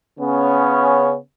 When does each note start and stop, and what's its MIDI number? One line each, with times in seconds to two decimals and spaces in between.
0.20 1.16 49
0.20 1.16 59
0.20 1.16 61